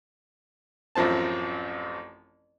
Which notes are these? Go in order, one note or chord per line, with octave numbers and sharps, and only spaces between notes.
A1 F#2 F3 C4 A5